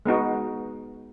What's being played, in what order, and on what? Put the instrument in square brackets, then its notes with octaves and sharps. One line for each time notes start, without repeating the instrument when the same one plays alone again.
[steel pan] G#3 B3 D#4 F#4